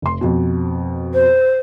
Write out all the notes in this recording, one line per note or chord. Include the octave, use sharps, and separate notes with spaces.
F1 C6
F2 B2
C5